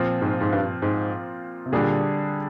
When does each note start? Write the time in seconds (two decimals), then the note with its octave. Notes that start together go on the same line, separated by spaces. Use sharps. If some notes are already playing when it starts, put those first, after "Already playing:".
Already playing: A#2 F3 C4 F4
0.21 G#2
0.41 G#2
0.52 G2
0.82 G#2
1.66 C3
1.72 A#2 D3 G3 D4 G#4